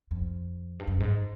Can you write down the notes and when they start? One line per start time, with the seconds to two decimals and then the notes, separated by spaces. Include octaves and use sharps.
0.11 F2
0.79 G2
0.87 F#2
1.00 G#2